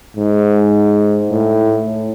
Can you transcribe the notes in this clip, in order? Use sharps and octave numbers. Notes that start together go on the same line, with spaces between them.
G#2
A2